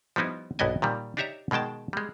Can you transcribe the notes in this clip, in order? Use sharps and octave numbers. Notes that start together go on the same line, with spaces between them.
F3 G3 B3 D#4 E4
B1 G2 B3 E4 D#5 G#5
A#2 D#3 G3
D4 D#4 G4 C#5 E5 A#5
B2 D#3 G#3 G5 A5
G3 G#3